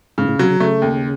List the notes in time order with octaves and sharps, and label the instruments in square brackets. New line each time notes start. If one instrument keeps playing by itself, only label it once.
[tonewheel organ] G#2 [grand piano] C#3
[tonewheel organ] A2
[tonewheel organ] C3 [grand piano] F#3
[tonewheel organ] C#3
[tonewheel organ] C#3 [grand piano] A3
[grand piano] D#2